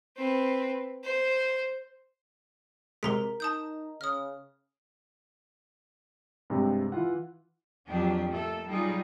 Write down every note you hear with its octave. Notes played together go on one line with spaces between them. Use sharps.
C4 B4
C5
C3 G#3 A#4 A#5 B6
D#4 A5 D#6 G6
C#3 D#6 F6
G2 C3 G#3 C4 G4
E3 E4 F4 F#5
F2 F#3 D4 G4 G#4
A3 A#3 A4
F#3 G3 D#4 F4 G#4